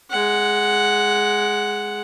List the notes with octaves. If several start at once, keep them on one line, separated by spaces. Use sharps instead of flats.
G#3 F#5